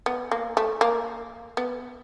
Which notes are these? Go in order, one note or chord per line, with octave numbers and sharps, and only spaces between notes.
B3
A#3
A3
A#3
B3